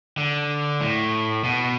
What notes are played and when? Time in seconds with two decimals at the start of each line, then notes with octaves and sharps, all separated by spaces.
0.17 D3
0.81 A2
1.44 B2